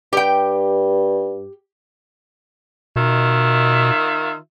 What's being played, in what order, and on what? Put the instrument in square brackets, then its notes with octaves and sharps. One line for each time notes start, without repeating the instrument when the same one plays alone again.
[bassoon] G2 [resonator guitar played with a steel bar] G4 G5
[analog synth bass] B2 [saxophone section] D#3 F4 E5